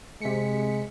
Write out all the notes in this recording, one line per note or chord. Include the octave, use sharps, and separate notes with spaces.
C3 G#3 B6 C#7